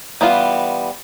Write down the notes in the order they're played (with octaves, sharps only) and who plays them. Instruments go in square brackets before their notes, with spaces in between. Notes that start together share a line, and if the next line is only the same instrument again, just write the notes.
[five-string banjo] E3 G3 B3 F4